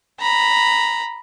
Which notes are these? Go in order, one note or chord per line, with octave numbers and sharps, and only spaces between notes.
A#5 B5